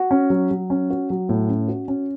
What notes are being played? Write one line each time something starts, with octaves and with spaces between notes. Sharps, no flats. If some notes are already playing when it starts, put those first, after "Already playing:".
Already playing: F#4
C#4
F#3
F#3
C#4
F#4
F#3
A2
C#4
F#4
C#4